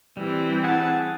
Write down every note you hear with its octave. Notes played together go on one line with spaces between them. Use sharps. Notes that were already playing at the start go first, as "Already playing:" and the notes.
E3 G3 C4
G#4 F#5 A5